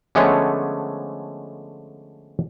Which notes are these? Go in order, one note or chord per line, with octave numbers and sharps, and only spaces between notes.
D3 F3 G#3 A3 B3 C#4